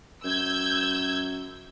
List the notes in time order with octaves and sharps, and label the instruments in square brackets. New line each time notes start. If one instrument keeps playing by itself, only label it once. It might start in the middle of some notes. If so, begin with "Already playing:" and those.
[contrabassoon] F#2 [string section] E6 G6 G#6